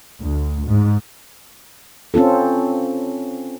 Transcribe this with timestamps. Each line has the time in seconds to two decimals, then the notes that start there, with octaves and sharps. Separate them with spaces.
0.21 D2
0.67 G#2
2.14 C4 C#4 F4 A4